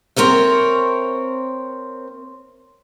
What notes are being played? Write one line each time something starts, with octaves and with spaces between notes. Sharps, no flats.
C4 A#4 C#5 E5